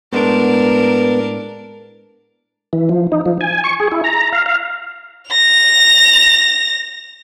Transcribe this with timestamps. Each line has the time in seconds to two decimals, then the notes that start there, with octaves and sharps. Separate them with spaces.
0.12 A2 G#3 B3 D4 A#4
2.73 E3
2.89 F3
3.12 D#4
3.26 F3
3.41 G#5
3.64 C#6
3.80 G#4
3.92 E4
4.04 A#5
4.32 F5
4.46 F5
5.31 A#6 F7